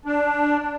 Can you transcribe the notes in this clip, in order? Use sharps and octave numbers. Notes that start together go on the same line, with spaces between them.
D4